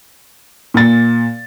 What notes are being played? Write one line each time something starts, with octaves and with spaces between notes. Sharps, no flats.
A#2 A6